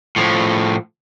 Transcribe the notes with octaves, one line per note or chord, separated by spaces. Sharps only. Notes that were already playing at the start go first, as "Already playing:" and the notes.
A2 F3